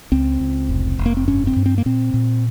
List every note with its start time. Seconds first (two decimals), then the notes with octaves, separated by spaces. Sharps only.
0.12 C#2 C4
0.40 C#2
0.69 F1
0.99 F1
1.06 A#3
1.17 C4
1.27 G2 C#4
1.47 C4
1.56 G2
1.66 C4
1.78 A#3
1.86 A#2 C4
2.14 A#2